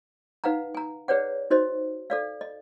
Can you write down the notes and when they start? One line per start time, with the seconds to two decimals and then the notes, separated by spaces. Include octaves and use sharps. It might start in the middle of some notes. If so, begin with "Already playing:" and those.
0.44 D#4 B4 F5 F#5 A#5
0.75 G#5 A#5
1.08 G#4 B4 C#5 D5 F#5
1.50 D#4 F#4 C5 D#5
2.10 A4 D5 F5
2.41 D#5